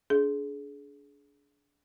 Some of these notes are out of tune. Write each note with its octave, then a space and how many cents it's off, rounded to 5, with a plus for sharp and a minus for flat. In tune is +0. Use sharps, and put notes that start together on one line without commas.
D4 -25 G#4 +25